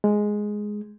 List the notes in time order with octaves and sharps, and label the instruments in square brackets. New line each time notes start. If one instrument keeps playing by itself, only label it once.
[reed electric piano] G#3